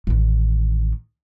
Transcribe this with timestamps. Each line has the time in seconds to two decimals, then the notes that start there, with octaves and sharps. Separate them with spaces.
0.07 A1 D#3